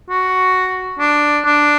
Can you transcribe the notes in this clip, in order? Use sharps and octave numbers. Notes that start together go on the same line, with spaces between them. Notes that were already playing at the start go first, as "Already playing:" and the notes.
F#4
D4
D4